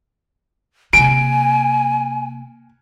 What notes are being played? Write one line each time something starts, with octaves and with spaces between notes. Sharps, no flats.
C3 A#3 G#5 D7